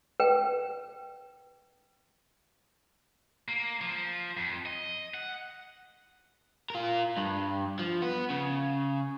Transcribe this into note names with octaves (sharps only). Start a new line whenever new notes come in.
B4 G5
A#3
F3
F2
D#5
F#5
F4 A#4
G2
F3
B3
C#3